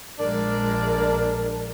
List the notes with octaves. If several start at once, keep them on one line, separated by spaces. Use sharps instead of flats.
A#1 F3 G#3 D4 A#4 D5